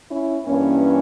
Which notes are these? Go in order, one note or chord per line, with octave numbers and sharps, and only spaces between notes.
C#4 E4
G2 E3 A#3 C#4